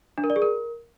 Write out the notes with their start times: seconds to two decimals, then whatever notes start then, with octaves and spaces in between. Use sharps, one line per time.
0.18 D4
0.24 A#4
0.30 D5
0.36 G#4
0.42 A#4